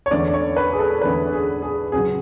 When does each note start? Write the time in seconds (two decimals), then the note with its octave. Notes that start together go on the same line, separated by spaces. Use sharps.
0.06 C#5
0.11 E2 D3 A3 C#4 D5
0.34 C#5
0.56 B4
0.73 G#4
0.79 A4
1.01 E2 D3 A3 C#4 B4
1.33 G#4
1.62 G#4
1.92 C#3 F#3 C#4 G#4